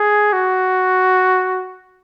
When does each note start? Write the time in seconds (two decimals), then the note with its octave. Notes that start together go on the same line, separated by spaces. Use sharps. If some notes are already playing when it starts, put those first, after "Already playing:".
Already playing: G#4
0.33 F#4